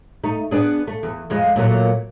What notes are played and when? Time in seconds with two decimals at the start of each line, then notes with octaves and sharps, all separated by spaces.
0.24 A3 D#4
0.51 B3 D4 G#4
0.87 A3
1.03 E2
1.30 F2 G#3 F4
1.56 A#2 F#3 A3